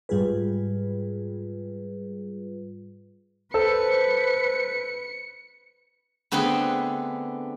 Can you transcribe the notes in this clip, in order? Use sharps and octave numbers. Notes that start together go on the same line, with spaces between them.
G#2 G3 F4 G#4 B4
A4 B4 C5 C#7
D3 A3 B3 C4 G#4 B4